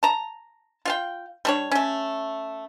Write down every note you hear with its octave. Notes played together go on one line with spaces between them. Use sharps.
A5 A#5
F4 F5 G5
G3 D4 C#5
A3 C#4